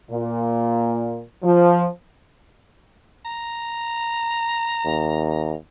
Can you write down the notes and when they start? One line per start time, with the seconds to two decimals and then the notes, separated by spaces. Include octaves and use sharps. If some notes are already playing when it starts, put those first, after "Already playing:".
0.11 A#2
1.44 F3
3.25 A#5
4.85 D#2